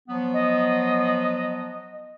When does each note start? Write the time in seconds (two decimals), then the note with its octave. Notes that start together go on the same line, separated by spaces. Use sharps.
0.09 F3 F#3 B3
0.34 D#5